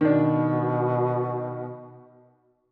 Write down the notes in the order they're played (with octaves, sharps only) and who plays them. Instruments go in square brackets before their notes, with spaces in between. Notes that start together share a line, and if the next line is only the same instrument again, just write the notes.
[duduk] B2 [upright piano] D#3 D4